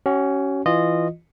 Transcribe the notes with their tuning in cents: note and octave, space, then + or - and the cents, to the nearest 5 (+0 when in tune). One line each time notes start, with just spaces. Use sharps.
C#4 +0 F#4 +35
E3 +0 F4 +0 D#5 -15